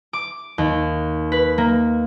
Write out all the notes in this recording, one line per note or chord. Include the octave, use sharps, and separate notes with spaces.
D6
D#2
B4
A#3